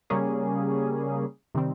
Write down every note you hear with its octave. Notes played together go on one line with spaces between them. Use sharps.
C#3 G3 A#3 C#4 G#4
C3 D#3 G3 C4